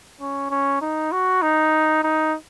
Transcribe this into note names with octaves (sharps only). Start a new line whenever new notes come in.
C#4
C#4
D#4
F#4
D#4
D#4